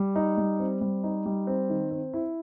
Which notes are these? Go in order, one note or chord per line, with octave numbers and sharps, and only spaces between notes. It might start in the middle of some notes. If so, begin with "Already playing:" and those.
Already playing: G3
D#4
G3
C4
G3
D#4
G3
C4
D#3
C4
E4